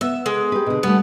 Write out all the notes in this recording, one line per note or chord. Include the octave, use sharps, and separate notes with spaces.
B3 E5
G#3
G4 B4
B2 D3
G3 A3 B3